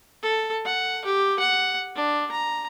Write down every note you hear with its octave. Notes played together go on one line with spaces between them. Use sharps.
A4
F#5
G4
F#5
D4
A#5